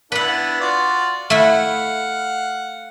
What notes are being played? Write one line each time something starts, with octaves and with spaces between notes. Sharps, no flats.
B3 D4 E4 B4 F#5
F4 F#4 D5
A3 E4 F5 F#5